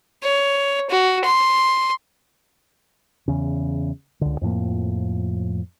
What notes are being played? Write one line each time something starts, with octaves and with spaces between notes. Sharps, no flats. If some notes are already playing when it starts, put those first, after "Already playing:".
C#5
F#4
C6
E2 C#3
C#2 D3
F2 A2 F3 A#3